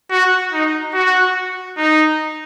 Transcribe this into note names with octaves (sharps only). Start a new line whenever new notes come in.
F#4
D#4
F#4
D#4